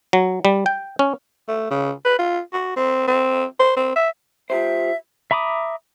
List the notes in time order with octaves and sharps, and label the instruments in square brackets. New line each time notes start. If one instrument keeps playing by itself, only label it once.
[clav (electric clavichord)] F#3
G3
G5
C#4
[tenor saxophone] A3
C#3
B4
F4
F#4
C4
C4
C5
C4
E5
[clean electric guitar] F4 G4 C5 [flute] E5
[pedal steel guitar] E5 A#5 B5 D6 D#6